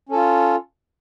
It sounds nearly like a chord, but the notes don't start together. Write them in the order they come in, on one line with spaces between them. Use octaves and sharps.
C#4 A4 F4